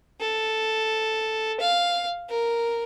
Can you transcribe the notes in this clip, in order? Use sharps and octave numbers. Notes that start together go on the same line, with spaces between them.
A4
F5
A#4